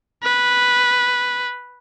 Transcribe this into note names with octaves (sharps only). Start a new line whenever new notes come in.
B4